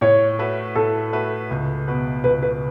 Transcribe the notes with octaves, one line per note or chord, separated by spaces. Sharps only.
A2 C#5
A3 F#4 B4 E5
A2 A4
A3 F#4 B4 E5
C#2
B2 B3 F#4 B4
C#2 B4
B4